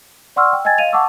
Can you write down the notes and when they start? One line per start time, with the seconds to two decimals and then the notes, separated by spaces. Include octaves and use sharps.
0.36 D5 F#5 C6 C#6 E6 F6
0.53 G5
0.65 D#5 G5 G#5 G#6 A6
0.78 D#5 F5 D#7 F7
0.93 F#5 A5 C#6 D6 E6